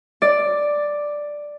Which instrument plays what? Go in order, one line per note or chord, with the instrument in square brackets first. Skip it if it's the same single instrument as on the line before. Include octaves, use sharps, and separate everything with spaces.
[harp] D5